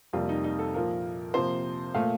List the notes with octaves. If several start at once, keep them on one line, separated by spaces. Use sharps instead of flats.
F2 C3 G3 A#3 F4
D#4
D#4
A4
A#2 F3 A#3 A#4
C3 F3 A#3 C5
A#2 A3 F5